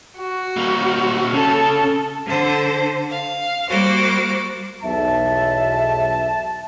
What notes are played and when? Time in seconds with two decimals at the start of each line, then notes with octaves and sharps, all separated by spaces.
0.18 F#4
0.57 G3 A#3
1.34 C#3 A4
2.27 D3 A4 C5
3.10 F5
3.70 G3 A#3 F#4 C5 D6
4.83 B1 E2 E5 A5